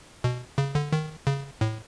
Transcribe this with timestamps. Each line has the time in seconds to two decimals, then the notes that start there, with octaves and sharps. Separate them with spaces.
0.24 B2
0.58 C#3
0.75 D3
0.92 D#3
1.27 C#3
1.61 A2